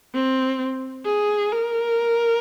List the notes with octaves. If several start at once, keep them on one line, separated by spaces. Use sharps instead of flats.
C4
G#4
A#4